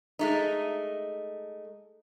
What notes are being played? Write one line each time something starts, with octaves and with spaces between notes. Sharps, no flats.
G#3 A3 D#4